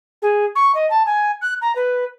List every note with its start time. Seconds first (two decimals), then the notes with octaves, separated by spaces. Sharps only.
0.22 G#4
0.55 C#6
0.75 D#5
0.90 A5
1.06 G#5
1.42 F#6
1.62 A#5
1.76 B4